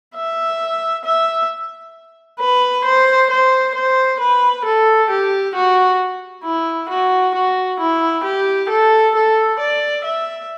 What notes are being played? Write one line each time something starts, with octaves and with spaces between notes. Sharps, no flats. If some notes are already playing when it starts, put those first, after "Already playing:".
E5
E5
B4
C5
C5
C5
B4
A4
G4
F#4
E4
F#4
F#4
E4
G4
A4
A4
D5
E5